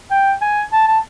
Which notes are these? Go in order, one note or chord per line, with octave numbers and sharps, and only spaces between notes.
G5
G#5
A5
A5